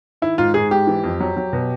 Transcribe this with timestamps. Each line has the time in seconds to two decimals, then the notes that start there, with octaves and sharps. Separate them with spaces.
0.22 D#3 E4
0.38 G#2 F4
0.54 G#2 G#4
0.71 G#3 G4
0.87 E3
1.04 F2
1.20 F#3
1.37 F#3
1.53 B2